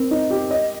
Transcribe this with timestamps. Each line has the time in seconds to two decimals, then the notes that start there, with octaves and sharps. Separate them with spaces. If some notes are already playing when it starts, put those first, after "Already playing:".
Already playing: C4 A#4
0.11 D#4
0.31 G4
0.51 D#5